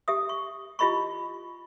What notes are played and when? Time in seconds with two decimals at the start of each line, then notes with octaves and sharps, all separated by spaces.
0.08 G4 E5 D#6
0.29 C#6
0.79 E4 F4 G4 D#5 B5 C#6